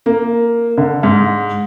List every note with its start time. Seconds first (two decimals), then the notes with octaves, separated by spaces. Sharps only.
0.06 A#3
0.78 D3
1.03 G#2